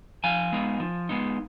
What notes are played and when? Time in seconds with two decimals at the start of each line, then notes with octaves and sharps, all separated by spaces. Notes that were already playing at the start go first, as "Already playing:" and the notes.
0.24 F3 F5 G#5
0.53 G#3 B3 D#4
0.80 F3
1.09 G#3 B3 D#4